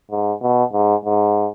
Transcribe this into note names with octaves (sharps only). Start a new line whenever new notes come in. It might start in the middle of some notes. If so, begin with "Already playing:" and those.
G#2
B2
G#2
G#2